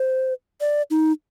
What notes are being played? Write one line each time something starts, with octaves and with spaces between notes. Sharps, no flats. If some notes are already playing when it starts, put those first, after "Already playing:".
Already playing: C5
D5
D#4